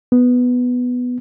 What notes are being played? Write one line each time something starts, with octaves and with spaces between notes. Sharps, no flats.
B3